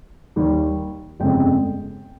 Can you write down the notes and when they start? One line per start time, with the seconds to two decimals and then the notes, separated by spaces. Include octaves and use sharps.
0.36 D#2 D#3 G3
1.20 G1 F2 C#3 G#3 G5